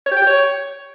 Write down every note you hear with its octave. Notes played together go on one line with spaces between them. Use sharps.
C#5
G4
G5
G4
C#5